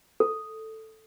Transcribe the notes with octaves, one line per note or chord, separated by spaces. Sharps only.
A4